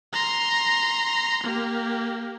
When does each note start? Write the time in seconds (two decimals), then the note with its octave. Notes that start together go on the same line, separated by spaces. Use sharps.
0.13 A#5 C6
1.43 A#3 G4